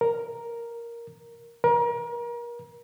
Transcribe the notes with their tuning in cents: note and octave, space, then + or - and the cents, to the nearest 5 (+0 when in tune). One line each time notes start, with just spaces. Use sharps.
A#4 +5
A#4 +35